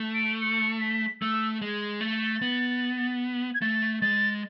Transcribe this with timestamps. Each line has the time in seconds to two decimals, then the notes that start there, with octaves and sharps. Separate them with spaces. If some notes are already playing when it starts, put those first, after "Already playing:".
Already playing: A3
0.14 D7
0.41 C#7
0.81 B6
1.21 A3 E6
1.61 G#3
2.01 A3 A6
2.42 B3
3.55 G#6
3.61 A3 A6
4.02 G#3 A6